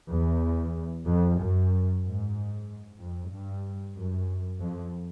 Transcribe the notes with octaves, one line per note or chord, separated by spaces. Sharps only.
E2
F2
F#2
G#2
F2
G2
F#2
F2